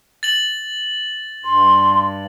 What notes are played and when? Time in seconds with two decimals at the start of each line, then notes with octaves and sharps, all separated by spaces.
0.23 A6 F#7
1.45 G2 C6